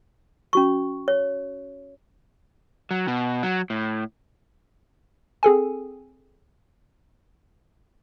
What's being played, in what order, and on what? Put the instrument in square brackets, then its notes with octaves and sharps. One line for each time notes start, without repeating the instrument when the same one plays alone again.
[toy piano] C#4 F#4 C#6
C#5
[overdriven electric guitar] F#3
B2
F#3
A2
[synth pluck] C4 G#4 A4 G#5